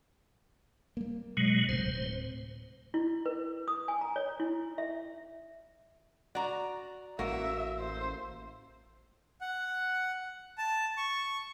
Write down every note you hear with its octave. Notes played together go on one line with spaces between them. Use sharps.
G3 A#3
B2 F#3 G#3
D1 A2 C3 C5
E4
B4
D#6
G#5
A#5
C#5
E4
E5
F#4 D5 A#5
A1 A#3 F#4 E5 F#5
C5
F#5
A5
C#6